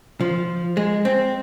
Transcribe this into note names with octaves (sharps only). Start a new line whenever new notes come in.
F3
G#3
C4